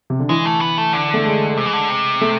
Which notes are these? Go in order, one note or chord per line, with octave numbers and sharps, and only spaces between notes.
C3
D3
E3 G#3
A3
B3
A3
D3
A3
G#3
C3
E3
D3
C3
A3